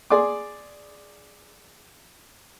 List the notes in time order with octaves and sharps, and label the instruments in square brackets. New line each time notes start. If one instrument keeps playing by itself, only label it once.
[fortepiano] G#4 D5 C6 D6